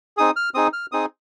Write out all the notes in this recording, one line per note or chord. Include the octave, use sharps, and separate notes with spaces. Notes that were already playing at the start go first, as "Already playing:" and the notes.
C4 D#4 G#4 D#6
F6
C4 D#4 G#4 D#6
F6
C4 D#4 G#4 D#6